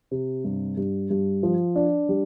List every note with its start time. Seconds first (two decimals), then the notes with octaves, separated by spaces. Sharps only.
0.11 C3
0.45 G2
0.77 G2
1.10 G2
1.43 F3
1.76 D4
2.09 G3